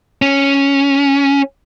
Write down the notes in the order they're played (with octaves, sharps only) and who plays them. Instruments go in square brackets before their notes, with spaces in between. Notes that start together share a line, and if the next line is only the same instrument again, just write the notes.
[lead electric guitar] C#4